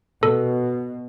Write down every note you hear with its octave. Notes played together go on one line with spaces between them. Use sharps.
B2 A4